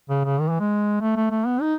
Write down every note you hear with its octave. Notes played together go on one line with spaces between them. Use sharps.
C#3
C#3
D#3
E3
G#3
A3
A3
A3
B3
D#4